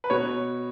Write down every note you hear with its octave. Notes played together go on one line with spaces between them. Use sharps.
B4
B2 C#5